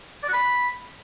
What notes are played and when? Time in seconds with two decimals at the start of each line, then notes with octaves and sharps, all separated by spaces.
0.23 D5
0.28 F#4
0.33 B5